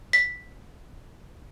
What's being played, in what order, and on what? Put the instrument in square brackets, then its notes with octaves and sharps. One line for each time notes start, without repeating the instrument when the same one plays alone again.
[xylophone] B6